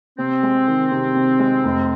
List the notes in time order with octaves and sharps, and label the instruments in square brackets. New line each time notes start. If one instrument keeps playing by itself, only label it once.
[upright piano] C3 [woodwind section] C4
[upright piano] G#3
D#3
C3
C3
G#3
F1